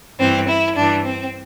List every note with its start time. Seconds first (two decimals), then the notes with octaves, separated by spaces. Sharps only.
0.19 G2 E3 C4
0.48 E4
0.75 G2 E3 D4
1.04 C4